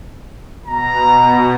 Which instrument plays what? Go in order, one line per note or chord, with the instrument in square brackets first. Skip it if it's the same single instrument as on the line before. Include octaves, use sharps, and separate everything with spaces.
[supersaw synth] B2 [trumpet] A#5